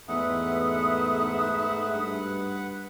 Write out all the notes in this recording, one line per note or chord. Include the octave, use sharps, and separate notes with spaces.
E2 G#2 A3 B4 E5 F#5 D#6
G2